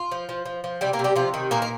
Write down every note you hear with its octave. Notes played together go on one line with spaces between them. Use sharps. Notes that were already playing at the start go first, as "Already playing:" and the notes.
Already playing: F4
F3
F3
F3
F3
C3 G3 G4
A#3 A#4
C3
G3 G4
C3 F3 F4
D#3
A#2 A#3 A#4
A#4